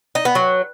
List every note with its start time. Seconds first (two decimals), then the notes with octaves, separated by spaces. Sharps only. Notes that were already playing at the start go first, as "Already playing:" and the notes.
0.15 D#4
0.25 B3
0.35 F#3